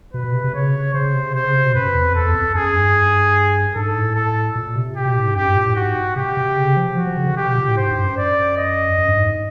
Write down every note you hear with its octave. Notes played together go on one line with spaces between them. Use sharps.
B2 B4
B2
C3
C3
C#3 C#5
C#3 C5
C3
C#3
C3 C5
C#3
C3
B2
F#2 B4
E2
F2
E2 A4
E2
F2
F#2 G#4
G2
G#2 A4
A2
A4
A#2
C3
G4
B2
A2
G#2
F#2 G4
G2
A#2
A2
G#2 F#4
C3 G4
C3
C#3
F3
F3 F#4
F3
C#3
D3
C3 G4
B2
A#2
A2
G#2 C5
G2
F#2
D5
D#5
F#2
G2
G#2